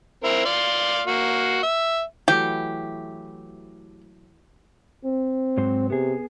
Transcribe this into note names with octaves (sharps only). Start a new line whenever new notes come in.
C4 E4 A#4
D5 F5 C6
A#3 F#4
E5
E3 F#3 A3 G4
C4
G#2 F#3 C5
C3 B3 G#4